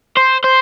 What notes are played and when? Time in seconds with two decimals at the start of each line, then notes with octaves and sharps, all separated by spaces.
0.17 C5
0.44 C5